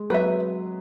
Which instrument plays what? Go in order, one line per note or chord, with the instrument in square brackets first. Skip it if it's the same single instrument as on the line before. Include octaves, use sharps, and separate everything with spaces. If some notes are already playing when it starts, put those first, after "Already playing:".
Already playing: [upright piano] G#3
[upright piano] F#3 [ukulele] B4 E5